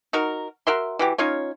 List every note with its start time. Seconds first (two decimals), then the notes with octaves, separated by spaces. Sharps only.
0.13 D#4 F#4 A#4
0.67 F#4 A#4 E5 C6
0.99 E3 F#4 G4
1.18 C#4 D#4 F4 C#5